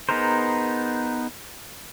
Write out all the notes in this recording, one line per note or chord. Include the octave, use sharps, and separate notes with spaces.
B3 D#4 G#4 A#4 C5